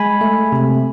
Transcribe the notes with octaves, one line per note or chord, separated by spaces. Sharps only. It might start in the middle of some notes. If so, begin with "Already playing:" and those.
Already playing: G#3 G#5 B5
A3
C3